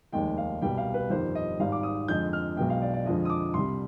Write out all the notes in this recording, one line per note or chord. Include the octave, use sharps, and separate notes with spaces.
F1 D#2 D#3 G#3 G5
F5
C2 B2 G3 G5
F5
B4
G1 F2 D#3 G3 C5
D#5
G#1 G#2 G3 F5
D6
D#6
F2 D3 G#3 G6
F6
B1 B2 G#3 G5
F5
D5
D5
F2 D3 F3 G#3 D#5
D#6
D6
C2 C3 G3 C6